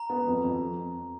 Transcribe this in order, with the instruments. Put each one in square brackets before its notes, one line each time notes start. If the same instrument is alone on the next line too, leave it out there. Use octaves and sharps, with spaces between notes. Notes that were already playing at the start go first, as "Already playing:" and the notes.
Already playing: [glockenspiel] A#5
[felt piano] B3
F2
F2